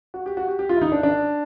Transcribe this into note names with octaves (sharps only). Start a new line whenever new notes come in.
F#4
G4
F#4
G4
G4
F4
E4
D#4
D4
D4